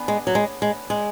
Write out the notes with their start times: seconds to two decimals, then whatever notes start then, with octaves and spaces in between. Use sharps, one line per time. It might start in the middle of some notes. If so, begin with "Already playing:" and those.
Already playing: B3 D4 G#4 B4
0.08 G#3
0.27 F#3
0.35 G#3
0.62 G#3
0.90 G#3